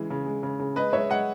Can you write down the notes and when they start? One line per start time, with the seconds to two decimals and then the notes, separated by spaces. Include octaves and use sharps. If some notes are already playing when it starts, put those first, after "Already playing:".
Already playing: C#3 E3 G#3
0.10 C#3
0.26 G#3
0.43 C#3
0.59 C#3
0.76 G#3 B4 D#5
0.93 G#3 C#5 E5
1.10 G#3 D#5 F#5